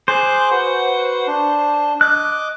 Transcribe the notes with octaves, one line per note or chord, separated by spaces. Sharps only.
G#4 C5 D6 F#6
F#4 B4 F#5
D4
D#5 D6 F#6